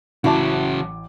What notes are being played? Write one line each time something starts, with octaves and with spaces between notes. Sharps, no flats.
A1 C#3 F#3 E4 F#4 E5 A5 D6